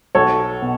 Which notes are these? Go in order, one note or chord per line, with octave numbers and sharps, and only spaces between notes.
B1 A4 C#5
B2